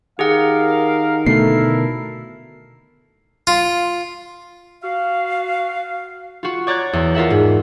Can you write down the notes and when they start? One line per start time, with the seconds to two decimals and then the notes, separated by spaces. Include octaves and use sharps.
0.19 D#3 G4 G#4 A#4 F5 F#5
1.27 B2 D3 A3 E4 A4 A#4 C7
3.47 F4
4.83 F#4 F5
6.43 F4 F#4
6.67 C#5 D5 A#5 F#6 G#6
6.93 E2
7.15 F4 A#4 E5 F#5
7.30 G#2